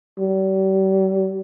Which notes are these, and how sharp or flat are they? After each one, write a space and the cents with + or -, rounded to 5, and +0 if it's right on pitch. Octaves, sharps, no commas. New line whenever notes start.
G3 -40